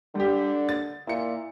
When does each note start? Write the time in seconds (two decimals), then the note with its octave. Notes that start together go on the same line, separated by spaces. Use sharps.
0.15 D3 G3 G4
0.69 A6
1.07 A#2 E4 C#7